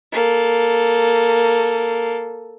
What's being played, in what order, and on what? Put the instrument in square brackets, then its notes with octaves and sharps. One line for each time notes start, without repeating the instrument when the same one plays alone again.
[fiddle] A#3 A4